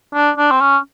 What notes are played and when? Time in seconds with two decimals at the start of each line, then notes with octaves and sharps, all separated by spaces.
0.14 D4
0.38 D4
0.51 C4
0.61 C#4